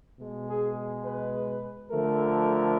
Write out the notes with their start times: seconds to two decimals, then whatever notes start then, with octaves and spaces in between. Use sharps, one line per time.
0.20 B2 G#3
0.49 G#4
1.06 B4
1.91 D3 F3 A3 A#4